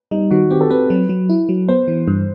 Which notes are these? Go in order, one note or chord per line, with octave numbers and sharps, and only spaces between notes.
G3 D#4
D#3 F#4
C4 G4
A4
C4 B4
F#3
F#3
E4
F#3
B3 C5
E3
G2